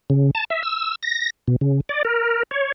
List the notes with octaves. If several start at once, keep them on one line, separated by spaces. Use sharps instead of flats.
C#3
A5
E5
E6
A#6
B2
C#3
D5
A#4
C#5